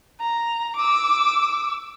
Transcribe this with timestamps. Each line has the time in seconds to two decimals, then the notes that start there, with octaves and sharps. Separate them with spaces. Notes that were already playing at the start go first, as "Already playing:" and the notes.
0.20 A#5
0.76 D6 E6